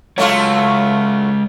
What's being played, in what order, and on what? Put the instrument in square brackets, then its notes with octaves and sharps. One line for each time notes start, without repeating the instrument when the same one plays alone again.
[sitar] F#3 A3 F4 [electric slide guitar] G#3 C#5